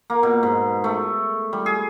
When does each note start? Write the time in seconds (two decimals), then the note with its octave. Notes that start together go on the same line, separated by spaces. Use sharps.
0.10 A#3
0.23 B2
0.43 G#2
0.84 A3
1.53 G3
1.66 G#4